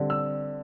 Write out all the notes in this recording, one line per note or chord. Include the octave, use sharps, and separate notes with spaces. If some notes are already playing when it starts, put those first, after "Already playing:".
Already playing: D3 G3 C4
E6